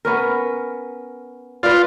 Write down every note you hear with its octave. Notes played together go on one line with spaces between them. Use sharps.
B3 C#4 A#4
F4 B4 D5